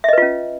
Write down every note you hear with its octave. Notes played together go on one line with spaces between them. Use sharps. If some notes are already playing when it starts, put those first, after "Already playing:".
C#4 F4 B4 D#5 E5